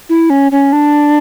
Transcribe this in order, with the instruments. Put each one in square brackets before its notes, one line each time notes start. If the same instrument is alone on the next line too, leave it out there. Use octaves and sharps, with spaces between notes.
[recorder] E4
C#4
C#4
D4